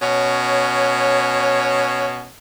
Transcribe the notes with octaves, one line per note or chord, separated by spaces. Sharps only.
B2 C#4 C#5